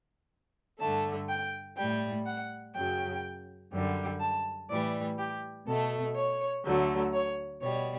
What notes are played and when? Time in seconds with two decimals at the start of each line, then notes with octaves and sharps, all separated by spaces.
0.80 G2 D3 A3 A5
1.29 G5
1.77 A2 G3 G5
2.26 F#5
2.75 F#2 C#3 F#3 G5
3.73 F#2 D3 G3
4.21 A5
4.70 A2 E3 G3 D5
5.19 G4
5.67 B2 A3 A4
6.16 C#5
6.65 D2 D3 F#3 A3
7.14 C#5
7.62 B2 G3 C#5